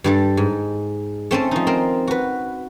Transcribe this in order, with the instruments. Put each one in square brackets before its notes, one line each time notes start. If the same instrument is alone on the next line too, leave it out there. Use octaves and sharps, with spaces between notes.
[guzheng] G2 G3 A4
G#2
A3 C4 C#4 A4
F3 D#4
C4 A#4
F#4 B4